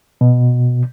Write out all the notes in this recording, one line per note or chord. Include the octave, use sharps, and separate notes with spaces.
B2